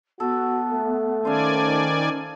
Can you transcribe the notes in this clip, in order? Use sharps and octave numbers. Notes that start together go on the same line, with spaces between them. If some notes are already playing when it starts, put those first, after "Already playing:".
B3 F#4 A4
A3
D#3 C#4 C5 D5 F5 G#5